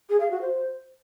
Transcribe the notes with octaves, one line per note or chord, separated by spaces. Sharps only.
G#4
F5
F#4
C5